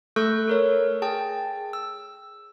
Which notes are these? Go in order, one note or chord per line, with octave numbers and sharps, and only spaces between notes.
A3 A4 C#6 E6 F#6 G6
A4 A#4 C#5
G#4 G5 A5
E6